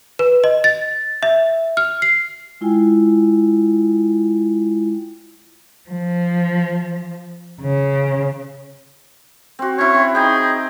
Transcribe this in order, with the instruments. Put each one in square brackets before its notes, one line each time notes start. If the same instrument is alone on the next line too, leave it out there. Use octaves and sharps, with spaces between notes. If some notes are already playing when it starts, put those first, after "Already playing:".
[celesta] B4
D#5
A6
E5
F6
C7
[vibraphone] G#3 E4 F4 G5 G#5
[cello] F3
C#3
[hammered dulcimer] C4 F#4
[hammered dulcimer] C#4 E4 [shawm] C#5
[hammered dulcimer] C4
[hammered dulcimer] D#4 G5 [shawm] G#4